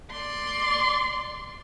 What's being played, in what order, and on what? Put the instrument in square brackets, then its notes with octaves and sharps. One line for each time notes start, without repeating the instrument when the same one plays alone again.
[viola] D5 C6